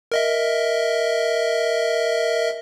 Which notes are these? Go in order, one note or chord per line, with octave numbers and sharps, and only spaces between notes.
A#4 D#5 E5